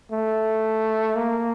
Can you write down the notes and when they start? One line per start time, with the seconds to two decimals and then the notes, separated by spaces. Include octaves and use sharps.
0.12 A3
1.16 A#3